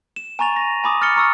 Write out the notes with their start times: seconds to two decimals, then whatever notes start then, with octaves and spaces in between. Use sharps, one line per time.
0.16 E7
0.39 G#5 A#5 C#6 A6 F7
0.56 A#6 D#7
0.84 G#5 B5 D6 D#6
1.02 F6 A6 C#7 G7
1.16 A#5 C#6 E6 A6